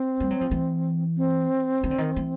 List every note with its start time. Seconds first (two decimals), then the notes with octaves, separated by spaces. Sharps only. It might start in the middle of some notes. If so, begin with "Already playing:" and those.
Already playing: C4
0.20 G3
0.30 F#3
0.41 F3
0.51 E3
1.17 C4
1.84 D#3
1.91 D3
1.98 D#3
2.16 E3